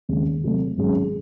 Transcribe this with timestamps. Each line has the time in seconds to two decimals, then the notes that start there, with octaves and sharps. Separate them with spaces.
0.09 D#2 C#3 G#3
0.43 C3 F#3 A3
0.77 G#1 G#2 F#3 C#4 G#4